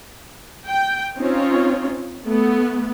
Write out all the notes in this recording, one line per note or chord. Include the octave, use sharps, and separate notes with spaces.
G5
C4 C#4 D#4 F4 C#5
A3 B3